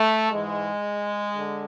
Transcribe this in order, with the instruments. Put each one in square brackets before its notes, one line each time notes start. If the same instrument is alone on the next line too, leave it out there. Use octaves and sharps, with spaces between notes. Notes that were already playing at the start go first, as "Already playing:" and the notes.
Already playing: [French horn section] A3
G#2 E3 G#3
D3